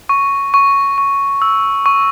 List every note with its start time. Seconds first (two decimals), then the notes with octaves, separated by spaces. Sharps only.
0.09 C#6
0.54 C#6
0.98 C#6
1.42 E6
1.86 C#6